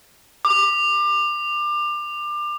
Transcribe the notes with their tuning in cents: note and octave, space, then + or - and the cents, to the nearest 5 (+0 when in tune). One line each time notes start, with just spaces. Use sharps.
D6 +30